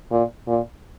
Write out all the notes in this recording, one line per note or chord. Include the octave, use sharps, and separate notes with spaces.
A#2
A#2